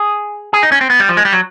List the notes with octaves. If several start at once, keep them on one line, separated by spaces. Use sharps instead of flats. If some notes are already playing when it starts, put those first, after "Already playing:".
Already playing: G#4
G#4
D#4
C#4
C4
B3
G3
F3
G#3
G3
F#3